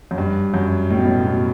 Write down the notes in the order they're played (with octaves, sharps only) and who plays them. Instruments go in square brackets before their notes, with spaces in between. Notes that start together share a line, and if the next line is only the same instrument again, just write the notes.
[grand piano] F#2
G2
F#2
A2
B2
A2
B2